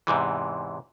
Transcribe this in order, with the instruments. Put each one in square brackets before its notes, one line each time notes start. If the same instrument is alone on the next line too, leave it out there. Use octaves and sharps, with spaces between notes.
[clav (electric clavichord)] E2 G#2 C3 E3